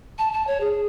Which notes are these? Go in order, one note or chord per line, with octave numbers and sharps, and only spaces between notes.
A5
A5
C#5
G#4